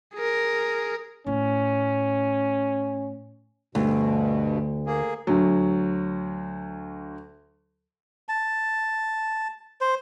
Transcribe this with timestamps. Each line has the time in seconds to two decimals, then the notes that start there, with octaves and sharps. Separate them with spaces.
0.15 G#4 A#4
1.26 A2 C#4
3.75 D2 G2 B2
4.86 A#3 G#4
5.27 D2 F#3
8.29 A5
9.81 C5